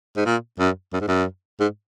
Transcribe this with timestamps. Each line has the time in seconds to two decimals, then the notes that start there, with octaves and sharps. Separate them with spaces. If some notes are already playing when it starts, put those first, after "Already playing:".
0.17 G#2
0.26 A#2
0.59 F#2
0.93 F#2
1.01 G#2
1.08 F#2
1.60 G#2